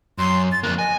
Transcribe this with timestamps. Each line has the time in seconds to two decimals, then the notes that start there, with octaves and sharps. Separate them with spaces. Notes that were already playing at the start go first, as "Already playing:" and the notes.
0.18 F#2 C6
0.52 A6
0.64 F2 A#3 F#6
0.79 D#5 G#5